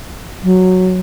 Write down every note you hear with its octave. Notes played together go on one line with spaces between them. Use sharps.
F#3